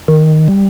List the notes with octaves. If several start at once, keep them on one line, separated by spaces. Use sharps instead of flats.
D#3
G3